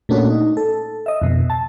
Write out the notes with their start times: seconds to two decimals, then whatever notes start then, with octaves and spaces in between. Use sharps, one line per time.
0.09 A#2 A3 A#3 C#4 D4 F#4
0.30 D#4
0.57 A4
1.06 D#5 E5
1.22 F2 B2
1.50 A5